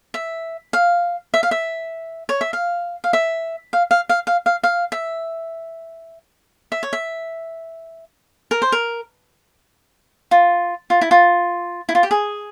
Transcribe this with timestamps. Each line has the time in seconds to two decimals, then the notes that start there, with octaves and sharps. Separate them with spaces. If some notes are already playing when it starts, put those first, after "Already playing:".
0.14 E5
0.73 F5
1.34 E5
1.43 F5
1.51 E5
2.29 C#5
2.41 E5
2.53 F5
3.04 F5
3.13 E5
3.73 F5
3.91 F5
4.09 F5
4.27 F5
4.46 F5
4.63 F5
4.92 E5
6.72 E5
6.83 C#5
6.93 E5
8.51 A#4
8.62 C5
8.72 A#4
10.31 F4
10.90 F4
11.01 E4
11.11 F4
11.89 E4
11.95 F4
12.03 G4
12.11 G#4